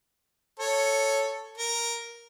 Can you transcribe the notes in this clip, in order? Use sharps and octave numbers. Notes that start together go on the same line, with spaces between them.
A4 C#5
A#4